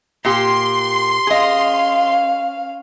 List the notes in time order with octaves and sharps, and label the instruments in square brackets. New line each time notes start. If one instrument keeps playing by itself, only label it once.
[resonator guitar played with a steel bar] A#2 G4 [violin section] C6
[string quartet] C#4 F5 [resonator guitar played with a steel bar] G#4 D#5